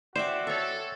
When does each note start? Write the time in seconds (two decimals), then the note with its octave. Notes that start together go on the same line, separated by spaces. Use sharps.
0.16 F#4 C5 D5 E5 G5
0.47 A4 C#5 E5